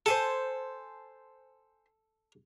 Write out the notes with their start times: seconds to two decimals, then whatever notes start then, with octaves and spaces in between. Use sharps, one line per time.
0.06 A4 C5 G#5 A5